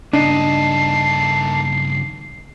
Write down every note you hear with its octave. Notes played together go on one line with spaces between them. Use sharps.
G2 C#3 A#3 D4 D#4 A4 C7